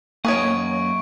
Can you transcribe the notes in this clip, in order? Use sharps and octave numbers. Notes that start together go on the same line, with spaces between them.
F#2 A#3 G#4 B4 C#5 D#5 C#6 D7